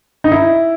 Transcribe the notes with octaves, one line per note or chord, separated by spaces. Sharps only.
D#4
E4